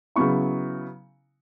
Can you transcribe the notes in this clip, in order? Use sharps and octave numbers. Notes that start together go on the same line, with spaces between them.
C#3 F#3 B3 E4 C#6